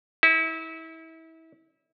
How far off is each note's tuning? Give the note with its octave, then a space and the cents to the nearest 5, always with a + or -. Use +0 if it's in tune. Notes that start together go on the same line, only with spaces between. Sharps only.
E4 -30